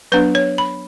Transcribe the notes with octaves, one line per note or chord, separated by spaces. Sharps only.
F#3 B3 D4 B4
C#5
B5